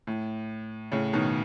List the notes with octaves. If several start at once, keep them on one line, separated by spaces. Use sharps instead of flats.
A2
A2 C#3
B2 D#3